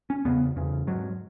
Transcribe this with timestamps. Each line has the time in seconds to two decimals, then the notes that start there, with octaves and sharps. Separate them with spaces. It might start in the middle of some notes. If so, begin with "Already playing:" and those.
0.10 C#4
0.25 E2 C#3 B3
0.56 E2 C#3
0.87 G#2 F#3